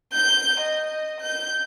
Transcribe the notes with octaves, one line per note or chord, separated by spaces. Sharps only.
G6
D#5
G6